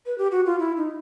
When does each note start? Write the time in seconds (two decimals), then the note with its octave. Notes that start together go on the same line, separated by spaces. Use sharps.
0.06 B4
0.18 G4
0.32 F#4
0.46 F4
0.60 E4
0.77 D#4